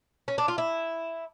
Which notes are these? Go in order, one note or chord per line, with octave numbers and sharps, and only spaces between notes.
C#4
D4
F4
E4